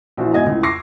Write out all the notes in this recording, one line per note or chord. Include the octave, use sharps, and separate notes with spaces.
A#1 E3 D4 F#4 C5
B1 G#2 B2 D#5 G#5 G#6
C#2 A2
C#6 D6 E6 A#6 C7